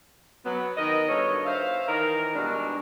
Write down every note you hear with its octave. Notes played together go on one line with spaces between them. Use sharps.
F#3 B3
D#3 A#4 D#5
G2 B2 A4 C#5
C5 E5 F5
D#3 E3 A#4
B2 G3 G#3 D4 F#4